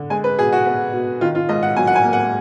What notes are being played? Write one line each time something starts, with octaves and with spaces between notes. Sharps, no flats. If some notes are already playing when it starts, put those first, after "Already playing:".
Already playing: D3
G#3 G#5
B4
B2 G#4
F#4
B3
B2
D#3 F4
F4
G#2 D#5
F#5
F#3 G#5
F#5
G#5
A#3
F#5